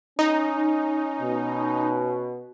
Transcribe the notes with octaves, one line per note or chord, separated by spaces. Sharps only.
C#4 D#4
B2